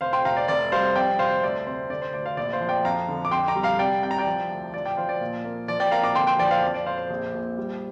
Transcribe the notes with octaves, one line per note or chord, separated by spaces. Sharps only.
F1 C5 F5
G5 C6
F1 F5 A#5
D5
F1 D5
G3 C5 F5
F2 D5 G5
F1 C5 F5
D2 D5
C3 C5
D3 D5
C5
D2 D5
C5 F5
A#1 D5
C5 F5
F3
D5 G5
F2 F5 A#5
D3
D6
F2 G5 C6
A#5 D6
G3
F5 A#5
C3 D5 G5
C2 G5
A#5
D5 G5
F3
D2
F3 D5
D5 G5
F3 C5 F5
D5
A#2
A#3
F3 D5
D5 G5
A#3 F5 A#5
A#5 D6
D3 G5 C6
G5 C6
F3 D5 G5
C5 F5
F2 D5
D5
F2 C5 F5
C5
A#1
A#2
G3